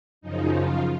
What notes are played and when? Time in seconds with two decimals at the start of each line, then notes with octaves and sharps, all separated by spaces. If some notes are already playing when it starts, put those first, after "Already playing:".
0.21 F#2 C#3 F3 D#4
0.51 F4